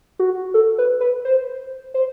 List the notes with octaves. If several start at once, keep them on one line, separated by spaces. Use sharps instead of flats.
F#4
A4
B4
B4
C5
C5